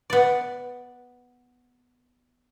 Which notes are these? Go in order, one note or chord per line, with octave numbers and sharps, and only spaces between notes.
B3 D5